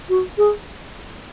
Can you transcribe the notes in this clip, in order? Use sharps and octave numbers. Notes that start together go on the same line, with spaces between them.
F#4
G#4